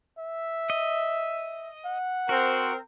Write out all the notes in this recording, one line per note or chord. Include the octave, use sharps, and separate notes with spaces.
E5
D#5
F#5
C4 F#4 A#4 C5